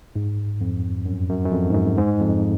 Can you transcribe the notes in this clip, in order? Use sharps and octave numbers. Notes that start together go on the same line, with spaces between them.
G#2
F2
F#2
F#2
F#2
F2
G#2
F#2
G#2
F2